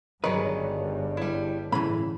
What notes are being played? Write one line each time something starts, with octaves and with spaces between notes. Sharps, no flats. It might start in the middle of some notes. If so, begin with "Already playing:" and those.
G1 G2 D#3 F#3 G#4 B4 C#5 D#5
G3 E4
A2 C#3 E3 B5